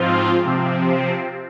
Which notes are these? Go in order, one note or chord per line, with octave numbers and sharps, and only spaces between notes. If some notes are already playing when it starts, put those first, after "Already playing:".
Already playing: G#2 F3 C4 F4
C3 F3 C4